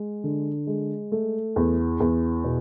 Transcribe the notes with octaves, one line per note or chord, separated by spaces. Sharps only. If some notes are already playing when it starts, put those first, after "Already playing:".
Already playing: G#3
D3
G#3
A3
E2
E2
B2